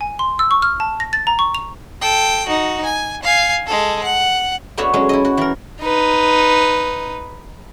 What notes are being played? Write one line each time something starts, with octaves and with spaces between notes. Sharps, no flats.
G#5
C6
E6
C#6
F6
A5
A#6
A6
A#5
C#6
F7
A4 G5
D#4 F#4
G#5
F5 G#5
G#3 A4
F#5
A3 B3 D4 F#4 C#5 E5
F#3 G#3 C#4 G#4
E4 A4 D#5
F#4
E3 A#4
D#4 B4